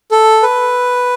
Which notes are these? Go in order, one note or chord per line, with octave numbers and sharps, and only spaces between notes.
A4
B4